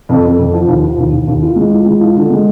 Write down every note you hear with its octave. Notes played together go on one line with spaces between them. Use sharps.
F2
F2
F2
F3
D#2
F3
D#2
D#2
D#2
F4
G#3
F4
G#3
F4
D3
G#3